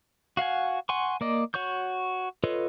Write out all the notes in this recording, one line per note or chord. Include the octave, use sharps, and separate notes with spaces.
F#4 F5 F#5 G#5
F#5 G#5 C6 C#6
A#3 D5 D#5
F#4 C#5 C#6 G6
F4 A4 B4 C#5 D#5